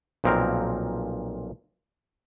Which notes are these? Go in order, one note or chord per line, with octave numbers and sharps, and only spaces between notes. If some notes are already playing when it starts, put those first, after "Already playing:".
B1 A#2 F3 C4 A#4